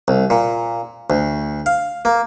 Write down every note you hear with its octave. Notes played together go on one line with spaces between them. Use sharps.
C2
A#2
D2
F5
A#3